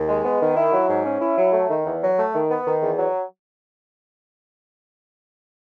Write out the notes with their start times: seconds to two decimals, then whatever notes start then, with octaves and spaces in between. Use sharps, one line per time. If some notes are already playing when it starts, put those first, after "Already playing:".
Already playing: D#2
0.08 G#3
0.25 B3
0.41 D#3
0.56 E4
0.73 F#3
0.89 G#2
1.05 C#4
1.21 E4
1.38 F#3
1.53 A3
1.69 D#3
1.86 E2
2.02 F#3
2.18 A3
2.34 D#3
2.50 B3
2.66 D#3
2.82 E2
2.98 F#3